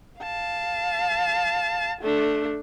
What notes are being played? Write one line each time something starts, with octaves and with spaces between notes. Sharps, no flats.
F5 A5
A3 D4